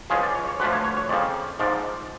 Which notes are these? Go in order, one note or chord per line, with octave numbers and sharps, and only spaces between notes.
C#2 C#3 F3 G#4
D5
C#5
C#5
D2 D3 F3 B4
C#5
C#5
C#5
F2 C#3 F3 D5
G#2 F3 D5